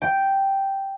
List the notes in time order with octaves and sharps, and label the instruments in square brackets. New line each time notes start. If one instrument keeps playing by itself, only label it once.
[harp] G5